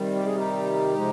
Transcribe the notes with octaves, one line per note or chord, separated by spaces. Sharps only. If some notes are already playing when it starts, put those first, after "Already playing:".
Already playing: C3 D#3 G3
G4
G#4
D#4 G4
C3 F3 G#3